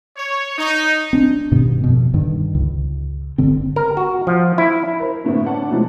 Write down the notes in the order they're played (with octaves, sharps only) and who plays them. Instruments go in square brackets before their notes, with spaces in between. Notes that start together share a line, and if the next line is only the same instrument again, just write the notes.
[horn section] C#5
D#4
[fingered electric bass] C4 D4
G2 B2 D#3 B3
F2 B2
G2 D3 D#3
C#2
G1 D3 C4
[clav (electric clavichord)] A#4
F#4
F3
E4
[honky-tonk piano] A#4 C5
F#2 A2 D3 A3 B3 C4
C#4 D4 F#5 A5
B2 E3 F3 G#3